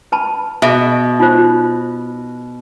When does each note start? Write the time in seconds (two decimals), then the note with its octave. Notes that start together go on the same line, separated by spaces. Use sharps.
0.12 B4 A5 B5
0.62 B2 G#4 D#5 E5
1.20 D#4 F4 C5